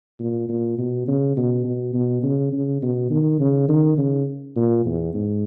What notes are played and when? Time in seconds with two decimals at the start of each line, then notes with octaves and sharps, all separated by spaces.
0.20 A#2
0.49 A#2
0.79 B2
1.08 C#3
1.37 B2
1.65 B2
1.94 B2
2.23 C#3
2.52 C#3
2.82 B2
3.11 D#3
3.40 C#3
3.69 D#3
3.98 C#3
4.56 A#2
4.85 E2
5.14 G#2